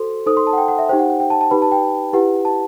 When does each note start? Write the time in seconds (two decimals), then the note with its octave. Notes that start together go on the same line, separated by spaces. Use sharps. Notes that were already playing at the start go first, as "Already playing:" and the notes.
Already playing: F#4 A4 C5 C6
0.26 D#4 A4 C5 D#6
0.37 C6
0.47 A5
0.53 F#5
0.58 G5
0.68 F#5
0.79 E5
0.89 D#4 G4 C5 G5
0.99 F#5
1.10 F#5
1.20 G5
1.30 A5
1.41 A5
1.51 D#4 G4 B4 B5
1.62 A5
1.72 G5
2.13 E4 G4 B4 F#5
2.45 A5